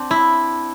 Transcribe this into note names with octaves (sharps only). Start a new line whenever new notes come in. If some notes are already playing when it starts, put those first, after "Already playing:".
Already playing: C4 D4
E4